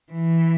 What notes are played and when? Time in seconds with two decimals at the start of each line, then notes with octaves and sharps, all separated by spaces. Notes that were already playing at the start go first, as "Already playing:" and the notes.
0.12 E3